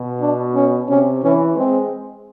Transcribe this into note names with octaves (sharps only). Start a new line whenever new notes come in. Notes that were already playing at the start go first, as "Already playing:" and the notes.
Already playing: B2
D4
C#4
C3 C#4
E3 C#4
G#3 C4